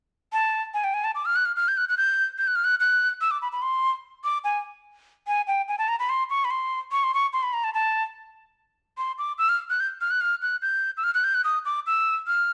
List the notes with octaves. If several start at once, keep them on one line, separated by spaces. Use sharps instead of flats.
A5
G#5
G5
G#5
A5
D6
F6
F#6
F6
F6
G6
F#6
F#6
G6
G6
F#6
F6
F#6
F#6
E6
D6
B5
B5
C6
D6
G#5
G#5
G5
G#5
A5
A#5
B5
C6
C#6
B5
C6
C#6
C6
C#6
C6
B5
A#5
A5
A5
C6
D6
E6
F6
F#6
G6
F6
F#6
F6
F#6
G6
E6
F6
F#6
G6
F#6
D#6
D6
E6
F6